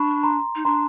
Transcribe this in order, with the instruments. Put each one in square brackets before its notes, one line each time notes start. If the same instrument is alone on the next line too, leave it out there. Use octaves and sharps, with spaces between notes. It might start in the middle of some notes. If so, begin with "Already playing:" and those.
Already playing: [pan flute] D4 [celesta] B5 C#6
[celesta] A#5 C6
[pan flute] D#4
[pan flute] D4 [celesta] A#5 C6